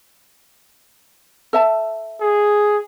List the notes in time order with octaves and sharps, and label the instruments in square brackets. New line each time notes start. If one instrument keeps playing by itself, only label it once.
[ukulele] A4 E5 A5
[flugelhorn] G#4